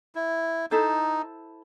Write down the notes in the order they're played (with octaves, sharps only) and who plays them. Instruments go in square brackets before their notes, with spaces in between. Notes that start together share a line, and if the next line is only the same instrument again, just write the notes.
[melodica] E4
[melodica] D#4 [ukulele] E4 A4 C5